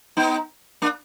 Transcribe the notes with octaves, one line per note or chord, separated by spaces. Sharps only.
B3 D#4
A#3 D4